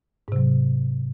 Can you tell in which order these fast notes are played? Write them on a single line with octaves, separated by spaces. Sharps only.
G#2 C3 F#3